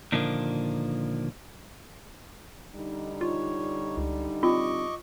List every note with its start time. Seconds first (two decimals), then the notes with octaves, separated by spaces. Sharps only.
0.12 A#2 D3 D#3 F3 G3 A#3
2.75 D3 G3 D#4
3.21 F4 C#5
3.97 C#2
4.43 C4 F4 D#5 C#6 D6